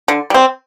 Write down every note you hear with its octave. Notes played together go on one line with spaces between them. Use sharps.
D3
G3 C4